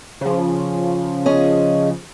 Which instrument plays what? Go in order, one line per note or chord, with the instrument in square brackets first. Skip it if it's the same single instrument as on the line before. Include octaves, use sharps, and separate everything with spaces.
[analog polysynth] C#3 F3
[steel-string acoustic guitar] C#4 G#4 D#5